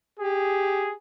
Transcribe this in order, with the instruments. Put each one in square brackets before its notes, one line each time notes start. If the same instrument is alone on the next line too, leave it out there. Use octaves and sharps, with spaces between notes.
[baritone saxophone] G4 [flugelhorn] G#4